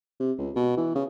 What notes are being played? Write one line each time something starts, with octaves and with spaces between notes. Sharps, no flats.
C3
C#2
B2
E3
C#3